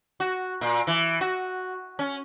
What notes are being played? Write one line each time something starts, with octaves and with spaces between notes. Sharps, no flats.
F#4
A#2
E3
F#4
C#4